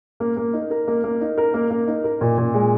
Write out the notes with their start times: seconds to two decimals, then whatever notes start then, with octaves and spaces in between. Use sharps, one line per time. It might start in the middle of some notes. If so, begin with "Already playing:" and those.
0.20 A#3
0.37 A#3
0.53 D#4
0.71 A#4
0.88 A#3
1.04 A#3
1.21 D#4
1.38 A#4
1.54 A#3
1.71 A#3
1.88 D#4
2.04 A#4
2.21 A#2
2.38 A#2
2.54 G#3